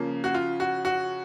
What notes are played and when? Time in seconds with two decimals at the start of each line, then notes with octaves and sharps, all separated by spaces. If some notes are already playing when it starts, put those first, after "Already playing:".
Already playing: C#3 F3 A#3
0.24 F#4
0.34 F4
0.60 F#4
0.85 F#4